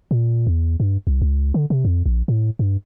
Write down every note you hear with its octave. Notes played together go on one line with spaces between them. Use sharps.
A#2
E2
G2
C2
C#2
D3
C3
F2
A#1
A2
G2